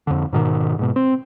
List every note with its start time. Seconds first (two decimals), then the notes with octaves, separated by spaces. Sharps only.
0.07 F2 D3
0.33 G#2 B2 D#3
0.79 G#2 B2
0.96 C4